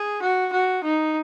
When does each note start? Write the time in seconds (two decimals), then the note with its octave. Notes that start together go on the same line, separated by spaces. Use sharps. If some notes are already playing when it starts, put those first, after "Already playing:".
Already playing: G#4
0.22 F#4
0.53 F#4
0.84 D#4